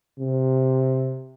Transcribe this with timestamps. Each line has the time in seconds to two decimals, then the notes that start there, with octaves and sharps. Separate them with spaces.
0.19 C3